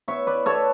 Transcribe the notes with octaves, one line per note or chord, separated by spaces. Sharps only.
B3 C#5 E5
B4 D5
B3 A4 C#5